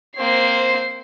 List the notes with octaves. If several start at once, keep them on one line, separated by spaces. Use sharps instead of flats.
A#3 C4 C5 C7